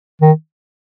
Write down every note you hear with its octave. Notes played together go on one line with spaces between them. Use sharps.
D#3